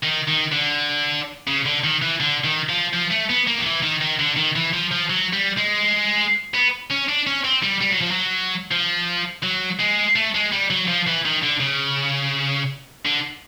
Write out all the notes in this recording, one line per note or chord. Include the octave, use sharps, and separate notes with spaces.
D#3
D#3
D3
C#3
D3
D#3
E3
D3
D#3
F3
F3
A3
B3
A#3
D#3
E3
D#3
D#3
D3
D#3
E3
F3
F3
F#3
G3
G#3
B3
C#4
D4
C#4
C4
G3
G3
F#3
F3
F#3
F3
F#3
G#3
A3
G#3
G3
F#3
F3
E3
D#3
D3
C#3
D3